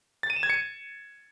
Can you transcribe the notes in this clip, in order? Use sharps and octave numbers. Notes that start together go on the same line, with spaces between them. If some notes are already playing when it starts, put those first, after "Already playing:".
A6
D#7
E7
G#6
C#7